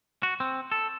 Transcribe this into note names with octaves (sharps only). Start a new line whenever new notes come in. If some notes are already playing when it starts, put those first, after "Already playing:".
F#4
C4
A4